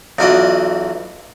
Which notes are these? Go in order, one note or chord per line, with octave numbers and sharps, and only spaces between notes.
B1 E2 F4 F#4 D5 D#5